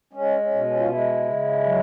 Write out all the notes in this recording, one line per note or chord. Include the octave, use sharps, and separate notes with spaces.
G#3 C#4
C#4
B2
C#4
F4
G#3 E4
C#3
F#3